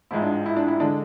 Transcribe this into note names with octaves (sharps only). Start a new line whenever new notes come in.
A1 G#2 F3 G#3 E4
D4
E4
D4
E4
D3 G#3 D4